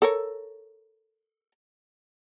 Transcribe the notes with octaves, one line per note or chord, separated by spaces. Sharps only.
A4 A#4 C#5